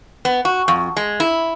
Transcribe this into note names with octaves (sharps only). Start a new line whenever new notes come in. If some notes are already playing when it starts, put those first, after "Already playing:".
B3
F#4
F2
G#3
E4